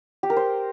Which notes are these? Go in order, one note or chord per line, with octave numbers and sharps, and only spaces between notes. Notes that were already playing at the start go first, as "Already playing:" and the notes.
G4
A#4
C5